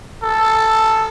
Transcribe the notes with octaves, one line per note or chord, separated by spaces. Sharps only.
A4